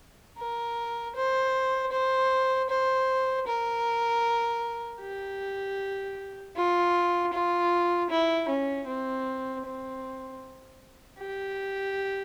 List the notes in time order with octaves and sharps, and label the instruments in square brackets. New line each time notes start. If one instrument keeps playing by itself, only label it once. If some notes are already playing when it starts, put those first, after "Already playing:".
[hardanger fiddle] A#4
C5
C5
C5
A#4
G4
F4
F4
E4
C#4
C4
C4
G4